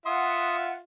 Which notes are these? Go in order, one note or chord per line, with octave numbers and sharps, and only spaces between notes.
F4 E5 F#5 C6 D#6